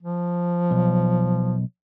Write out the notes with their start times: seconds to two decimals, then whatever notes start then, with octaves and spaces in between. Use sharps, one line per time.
0.02 F3
0.71 B1